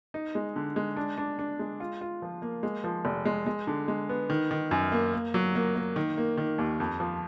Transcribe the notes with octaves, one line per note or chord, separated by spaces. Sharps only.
D#4
G#3
D3
G#3
D4
D4
D4
G#3
F4
F4
F3
A#3
G#3
F3
F1
G#3
G#3
D3
G#3
B3
D#3
D#3
F#2
A#3
A#3
F#3
A#3
A#3
D#3
A#3
D#3
D#2
F2
F3